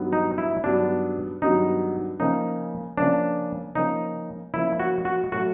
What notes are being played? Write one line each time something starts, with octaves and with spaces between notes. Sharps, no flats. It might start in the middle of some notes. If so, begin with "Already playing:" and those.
Already playing: G2 D#3 F#3 B3
D#4
E4
G2 D#3 F#3 B3 D4
G2 D#3 F#3 B3 D#4
C#3 F3 A#3 C#4 D#4
C#3 F3 A#3 C#4 D4
C#3 F3 A#3 C#4 D#4
C#3 F3 A#3 C#4 E4
F#4
F#4
A2 F#3 A3 F#4